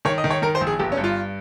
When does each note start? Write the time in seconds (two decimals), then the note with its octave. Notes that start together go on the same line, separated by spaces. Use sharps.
0.05 D#3 C#5
0.18 D#5
0.24 D#3
0.30 C#5
0.42 D#3 A#4
0.55 C5
0.61 A#1
0.67 G#4
0.79 G1 G4
0.92 C#4
0.97 G2
1.04 F4